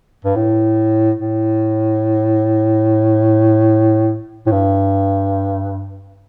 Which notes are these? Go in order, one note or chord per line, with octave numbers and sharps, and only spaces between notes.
G2
A2
A2
A2
G2